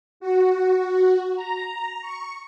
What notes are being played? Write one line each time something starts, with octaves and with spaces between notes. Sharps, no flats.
F#4
A#5
C#6